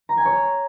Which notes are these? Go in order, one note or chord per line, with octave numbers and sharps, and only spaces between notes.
A#5
G#5
C#5